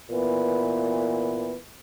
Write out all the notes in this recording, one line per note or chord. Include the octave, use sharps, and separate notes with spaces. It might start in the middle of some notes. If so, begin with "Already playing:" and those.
A#2 E3 B3